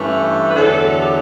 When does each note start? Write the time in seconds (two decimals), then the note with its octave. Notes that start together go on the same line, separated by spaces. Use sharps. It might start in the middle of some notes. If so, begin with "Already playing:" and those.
Already playing: G2 E3 A3 C#4
0.49 B4
0.55 E2 D3 F#3 B3 A4
1.02 G4